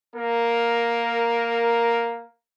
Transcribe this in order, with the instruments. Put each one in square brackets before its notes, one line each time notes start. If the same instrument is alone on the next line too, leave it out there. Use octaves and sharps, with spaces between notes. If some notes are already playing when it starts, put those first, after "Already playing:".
[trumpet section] A#3 A#4